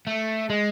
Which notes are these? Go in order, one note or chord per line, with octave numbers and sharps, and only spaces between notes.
A3
G#3